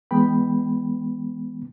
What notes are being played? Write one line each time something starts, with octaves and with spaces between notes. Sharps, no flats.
E3 G#3 B3 G5 B5